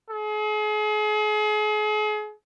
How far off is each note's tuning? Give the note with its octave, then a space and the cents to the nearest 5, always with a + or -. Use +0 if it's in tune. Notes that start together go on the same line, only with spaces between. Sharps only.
G#4 +40